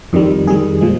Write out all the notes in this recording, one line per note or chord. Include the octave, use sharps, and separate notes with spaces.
F2 D#3 G3
F2 D#3 G3 G#4
A#2 F3 G#3